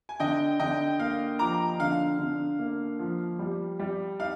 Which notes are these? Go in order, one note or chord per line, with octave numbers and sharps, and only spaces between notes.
G#5
D3 D#5 G5
D3 D#5 G5
A#3 F5
F3 A#5 D6
D3 F5
D3
A#3
F3
G3
G3
D#4 F5